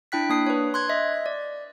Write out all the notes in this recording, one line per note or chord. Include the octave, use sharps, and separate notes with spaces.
D4 E4 G5 F#6 B6
A#3 D4 D#6 C7
B4 C#5
C6 F#6 G#6
D#5 E5
D5